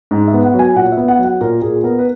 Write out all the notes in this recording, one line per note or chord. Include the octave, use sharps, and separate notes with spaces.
G#2
E5
B3
F#5
F#3
G#5
A#2 F#5
B3 E5
F#5
F#3
F#5
A#2 A#4
A#2 G#4
B3 A#4
B4